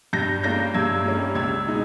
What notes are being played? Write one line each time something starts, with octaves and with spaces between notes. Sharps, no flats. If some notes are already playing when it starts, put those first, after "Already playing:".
G2 G6 A#6
G3 A#3 C#4 G6 A#6
G2 E6 G#6
G3 A#3 C#4
C#2 E6 G#6
B2 G#3 D#4